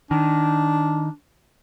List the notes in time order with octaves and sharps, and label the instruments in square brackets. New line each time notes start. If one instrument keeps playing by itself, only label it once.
[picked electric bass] D#3 [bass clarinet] D4